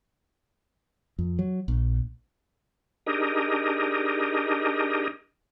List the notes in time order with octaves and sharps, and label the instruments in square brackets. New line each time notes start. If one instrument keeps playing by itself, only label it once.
[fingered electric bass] F2
F#3
A#1
[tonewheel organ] D4 D#4 G4 G#4 A#4 D#5